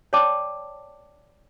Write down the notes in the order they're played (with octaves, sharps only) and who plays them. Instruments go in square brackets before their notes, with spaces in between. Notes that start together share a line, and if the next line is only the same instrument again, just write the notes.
[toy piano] C#5 D5 G5 A5 D6